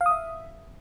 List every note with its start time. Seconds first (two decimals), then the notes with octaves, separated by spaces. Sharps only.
0.01 F5
0.06 D#6
0.11 E5